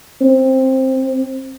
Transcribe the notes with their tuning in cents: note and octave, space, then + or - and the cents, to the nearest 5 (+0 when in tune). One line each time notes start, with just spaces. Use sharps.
C4 +10